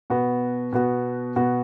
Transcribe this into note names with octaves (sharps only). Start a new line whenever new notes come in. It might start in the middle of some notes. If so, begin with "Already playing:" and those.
B2 B3 F#4
B2 B3 F#4
B2 B3 F#4